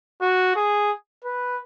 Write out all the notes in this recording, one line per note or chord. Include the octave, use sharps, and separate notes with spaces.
F#4
G#4
B4